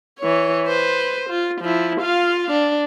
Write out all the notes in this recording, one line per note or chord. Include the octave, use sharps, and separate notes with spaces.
E3 C#5
B4 C5
F4
F3 E4
F4 F5
D4